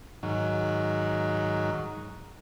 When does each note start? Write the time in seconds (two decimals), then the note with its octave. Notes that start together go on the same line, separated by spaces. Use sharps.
0.23 G#2 D#3 F#3